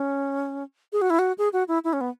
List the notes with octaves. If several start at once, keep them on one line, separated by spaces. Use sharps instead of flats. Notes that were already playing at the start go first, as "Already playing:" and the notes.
Already playing: C#4
G#4
F#4
E4
F#4
G#4
F#4
E4
E4
C#4
B3